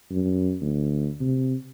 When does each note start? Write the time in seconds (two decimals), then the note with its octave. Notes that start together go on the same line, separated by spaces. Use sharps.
0.11 F#2
0.61 D2
1.20 C3